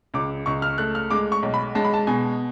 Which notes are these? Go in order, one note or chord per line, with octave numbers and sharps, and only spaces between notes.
C#2 D6
C#2 C#6
F6
A3 F#6
F6
G#3 D6
C#6
B1
B5
G#3 A5
B5
A5
B2 G#5